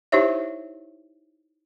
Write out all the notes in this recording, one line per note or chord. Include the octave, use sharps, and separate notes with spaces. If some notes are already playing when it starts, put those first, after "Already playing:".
D#4 E4 G4 C5 C#5 E5